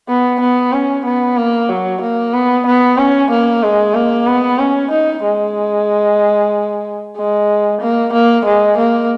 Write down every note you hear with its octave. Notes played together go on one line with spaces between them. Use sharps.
B3
B3
C#4
B3
A#3
F#3
A#3
B3
B3
C#4
A#3
G#3
A#3
B3
C#4
D#4
G#3
G#3
A#3
A#3
G#3
A#3